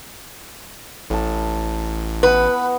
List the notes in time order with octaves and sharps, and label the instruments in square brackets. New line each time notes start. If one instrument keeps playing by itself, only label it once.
[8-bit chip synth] A1 [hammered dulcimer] A2 A5
[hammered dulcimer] B3 F#5 [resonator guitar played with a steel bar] B4